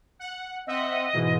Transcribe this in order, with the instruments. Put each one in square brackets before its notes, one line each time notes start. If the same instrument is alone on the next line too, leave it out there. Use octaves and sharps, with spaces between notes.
[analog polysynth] F#5
[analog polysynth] C4 E5 F#5 [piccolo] D#5
[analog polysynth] G#2 B2 E3